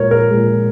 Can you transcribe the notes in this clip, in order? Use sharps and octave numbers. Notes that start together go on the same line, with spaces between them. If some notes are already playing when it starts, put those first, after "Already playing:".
Already playing: A#2 G#3 A#4 C#5
A#4
A#2 G#3